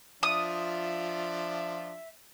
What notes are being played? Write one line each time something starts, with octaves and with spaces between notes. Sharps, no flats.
F3 D4 F4 E5 D#6